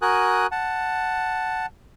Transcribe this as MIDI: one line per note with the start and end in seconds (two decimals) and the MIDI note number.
0.02 0.47 66
0.02 0.47 70
0.02 0.47 80
0.02 0.47 87
0.02 0.47 90
0.52 1.66 78
0.52 1.66 81